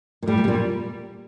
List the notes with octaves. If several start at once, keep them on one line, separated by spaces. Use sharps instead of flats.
A#2
A2 G3
A#2
C3
A#2